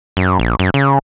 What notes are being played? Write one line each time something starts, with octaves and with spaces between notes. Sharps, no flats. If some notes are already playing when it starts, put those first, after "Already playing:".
F#2
A#1
F#2
C#3